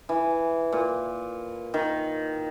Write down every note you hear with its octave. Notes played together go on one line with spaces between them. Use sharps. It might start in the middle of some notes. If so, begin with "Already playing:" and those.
E3
A#2
D#3